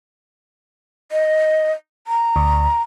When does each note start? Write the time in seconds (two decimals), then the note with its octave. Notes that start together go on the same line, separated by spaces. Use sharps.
1.12 D#5
2.07 A#5
2.36 D2